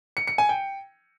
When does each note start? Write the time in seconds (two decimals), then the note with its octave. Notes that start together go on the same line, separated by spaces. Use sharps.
0.17 C#7
0.27 C#7
0.38 G#5
0.49 G5